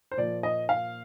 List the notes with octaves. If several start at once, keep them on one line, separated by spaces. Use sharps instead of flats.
C5
A#2 F3 A#3 D5
D#5
F5